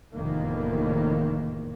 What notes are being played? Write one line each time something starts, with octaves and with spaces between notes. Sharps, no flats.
F1 E2 A2 D#3 A#3